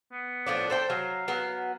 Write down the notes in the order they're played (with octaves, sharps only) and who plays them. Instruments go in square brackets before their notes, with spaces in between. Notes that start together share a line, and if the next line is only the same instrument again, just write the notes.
[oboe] B3
[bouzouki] A2 F3 D4
A4 C5 G5
[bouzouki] F#3 [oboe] F5
[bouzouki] F#3 B3